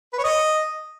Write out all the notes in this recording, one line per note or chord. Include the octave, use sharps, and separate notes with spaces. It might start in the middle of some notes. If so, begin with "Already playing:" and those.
B4
C#5
D#5